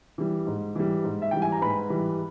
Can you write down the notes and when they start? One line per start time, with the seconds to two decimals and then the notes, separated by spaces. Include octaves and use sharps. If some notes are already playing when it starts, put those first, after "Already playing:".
0.18 E3 G3
0.47 G#2
0.75 E3 G3
1.04 G#2
1.22 E5
1.31 E3 G3 G5
1.42 G#5
1.52 A#5
1.62 G#2 B4 B5
1.90 E3 G3